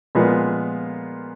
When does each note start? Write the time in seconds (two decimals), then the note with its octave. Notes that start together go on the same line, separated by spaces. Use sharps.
0.15 A#2 F3 G#3 B3